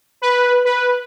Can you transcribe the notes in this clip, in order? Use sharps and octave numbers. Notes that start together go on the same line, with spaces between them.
B4
B4